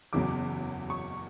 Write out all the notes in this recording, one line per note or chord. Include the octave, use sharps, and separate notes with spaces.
F#1 E2 C#3 F#3 D6
C#6